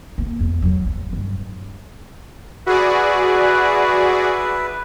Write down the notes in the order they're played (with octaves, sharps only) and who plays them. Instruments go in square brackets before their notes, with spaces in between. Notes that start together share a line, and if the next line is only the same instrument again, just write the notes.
[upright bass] A#3
E2
F#3
G3
G2
[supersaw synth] F#4 G#4 D5 [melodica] B4 E5